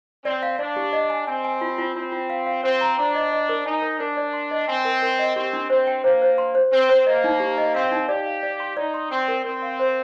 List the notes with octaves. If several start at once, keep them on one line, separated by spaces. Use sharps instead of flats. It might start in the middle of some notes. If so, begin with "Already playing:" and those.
C4 D5
F5
D4 D5
G4
D#5
G#5
C4 G#5
G#5
F4
F4
C4 F4
F4
F5
F5
C4 C5
A#5
D4 A#5
D#5
D#5
A#4
D#4 G#5
A#4
D4 A#4
D5
C6
D#5
C4 G#5
A#4
A#4
D#5
C4 G4
D4
C4 C5
G5
A#3 C5
C5
C6
C5
C4 C5
C5
A#3 D#5
D#4
G4
D#5
C4 F5
D#4
G4 D5
F5
D5
C6
D#4 D5
C6
C4 C6
A#4
C4 A#4
F5
C5